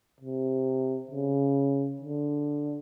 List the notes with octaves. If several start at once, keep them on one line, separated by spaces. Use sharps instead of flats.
C3
C#3
D3